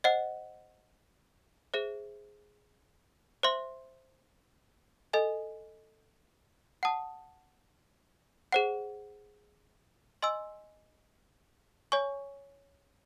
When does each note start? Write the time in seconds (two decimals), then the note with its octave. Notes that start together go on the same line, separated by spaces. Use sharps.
0.04 C5 D#5 F#5
1.74 G#4 C5 E5
3.43 C5 E5 C6
5.13 A4 D#5 G#5
6.83 F#5 A5 D#6
8.52 G#4 C5 F#5
10.22 D#5 G#5 C6 E6
11.92 C#5 G#5 C#6